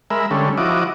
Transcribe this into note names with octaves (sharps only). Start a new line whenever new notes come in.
G#3 A#4 E5 B5
D3 G3 G#3 C#4 A4
F3 E4 F#4 D#5 D6